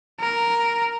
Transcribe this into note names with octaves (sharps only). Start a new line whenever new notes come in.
A#4